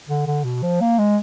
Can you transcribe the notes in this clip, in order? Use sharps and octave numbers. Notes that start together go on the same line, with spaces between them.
D3
D3
B2
F3
A#3
G#3